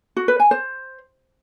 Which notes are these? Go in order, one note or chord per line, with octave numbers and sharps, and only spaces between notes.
F#4
B4
G#5
C5